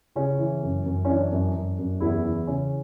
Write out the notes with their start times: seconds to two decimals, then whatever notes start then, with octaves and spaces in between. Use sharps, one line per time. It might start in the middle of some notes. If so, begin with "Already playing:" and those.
0.15 C#3 C#4
0.39 E3
0.63 F#2
0.86 F#2
1.05 C#4
1.09 E3 D4
1.32 F#2
1.54 F#2
1.79 F#2
2.00 E2 E4
2.24 E3
2.47 C#3 C#4